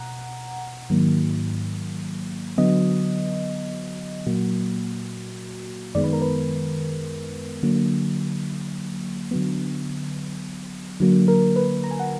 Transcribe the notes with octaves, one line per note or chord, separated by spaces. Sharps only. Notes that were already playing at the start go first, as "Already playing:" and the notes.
Already playing: B2 F#5 A#5
G#2 D#3 F#3 A#3
D3 F#3 B3 D#5
A#2 F#3 A#3 F#4
F#2 D#3 G#3 B3 D5
B4
A#4
B4
D3 F#3 A#3
D3 F#3 B3
D3 F#3 A#3
A#4
B4
A#5
G#5
F#5